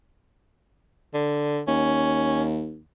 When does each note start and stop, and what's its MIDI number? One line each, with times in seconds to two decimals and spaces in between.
1.14 1.60 50
1.68 2.81 39
1.68 2.44 61